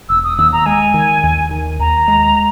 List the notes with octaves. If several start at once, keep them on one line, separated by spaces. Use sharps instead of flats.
E1 E6
D#6
D#2 E6
A#5
G#3 G#5
D#3
D#2
D#3
D#2 A#5
G#3